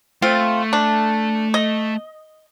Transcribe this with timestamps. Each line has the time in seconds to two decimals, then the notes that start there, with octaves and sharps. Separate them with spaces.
0.22 A3 C4 F4
0.73 D4
1.54 D#5